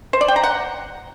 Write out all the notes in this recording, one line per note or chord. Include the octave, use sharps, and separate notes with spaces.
C5
D5
G5
A#5
F#5